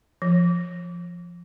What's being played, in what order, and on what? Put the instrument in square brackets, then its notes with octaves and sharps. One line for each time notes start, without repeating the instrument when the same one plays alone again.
[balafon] F3